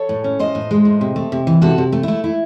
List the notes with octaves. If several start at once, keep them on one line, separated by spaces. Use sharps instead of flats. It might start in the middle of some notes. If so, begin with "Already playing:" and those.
Already playing: A4 C#5
A2
C#4
A2 C5 D#5
A2
G#3
A2
C3
A3
C3
E3
C3 F#4 A4
C3
A3
A3 E4
E4